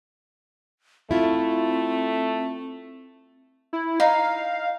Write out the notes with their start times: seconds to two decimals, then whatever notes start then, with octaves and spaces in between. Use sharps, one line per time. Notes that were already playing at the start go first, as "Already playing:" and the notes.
1.11 A3 C4 E4 F4
3.73 E4
4.00 D#4 F5